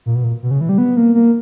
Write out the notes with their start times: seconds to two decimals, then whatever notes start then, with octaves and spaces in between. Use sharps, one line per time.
0.06 A#2
0.15 B2
0.24 A#2
0.43 B2
0.51 C#3
0.61 E3
0.69 G3
0.78 B3
0.97 A#3
1.15 A#3